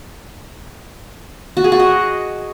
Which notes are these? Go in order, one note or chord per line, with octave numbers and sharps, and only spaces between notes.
F#4
G#4
F#4
D#5